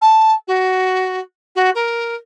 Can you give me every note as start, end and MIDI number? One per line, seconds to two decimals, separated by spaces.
0.02 0.33 81
0.48 1.19 66
1.56 1.70 66
1.75 2.15 70